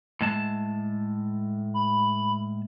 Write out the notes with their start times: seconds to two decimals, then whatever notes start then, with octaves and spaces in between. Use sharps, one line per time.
0.21 A2 G#3 A5
1.74 B5